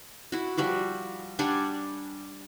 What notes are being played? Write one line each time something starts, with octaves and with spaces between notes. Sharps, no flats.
E4 F#4
F3 G3 F#4 E5
G3 D4 F#5 G#5